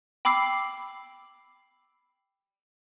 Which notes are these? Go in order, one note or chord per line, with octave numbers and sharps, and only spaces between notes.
G5 B5 D6 E6 C7